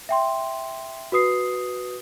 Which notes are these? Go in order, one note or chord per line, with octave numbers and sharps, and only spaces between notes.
E5 G5 C6
F#4 B4 D#6 C7